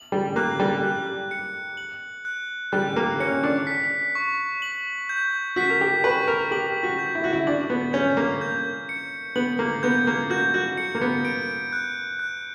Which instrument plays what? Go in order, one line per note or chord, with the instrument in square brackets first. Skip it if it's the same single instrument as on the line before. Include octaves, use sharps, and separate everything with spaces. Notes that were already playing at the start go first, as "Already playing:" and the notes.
Already playing: [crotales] F#7
[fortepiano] G3
[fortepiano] A#3 [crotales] F#6
[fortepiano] G3
[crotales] F#6
C#7
F#7
F#6
[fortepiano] G3 [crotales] F#6
[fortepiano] A#3
[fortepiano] C#4 [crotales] C#7
[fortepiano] D4
[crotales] B6
C#6
F#7
G6
[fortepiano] F#4 [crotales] B6
[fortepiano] A#4
G4
[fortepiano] B4 [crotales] C#6
[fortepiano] A#4
[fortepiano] G4 [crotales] F#7
[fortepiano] F#4
[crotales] G6
[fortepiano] E4
F#4
E4
[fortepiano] D4 [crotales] F#7
[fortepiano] B3
[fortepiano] C#4 [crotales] G6
[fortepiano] A#3
[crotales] G6
C#7
[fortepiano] B3 [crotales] F#7
[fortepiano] A#3
[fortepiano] B3 [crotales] G6
[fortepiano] A#3
[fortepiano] F#4 [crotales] G6
[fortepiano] F#4
[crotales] C#7
[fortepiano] A#3
B3
[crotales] D7
F#6
F#6